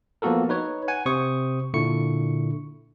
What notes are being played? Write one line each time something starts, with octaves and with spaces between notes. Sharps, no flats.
F3 A#3 B3 F#4 A4 A#4
D#4 B4 C#5
F#5 G#5
C3 C5 C#6 D#6
A#2 D3 E4 C#6 C#7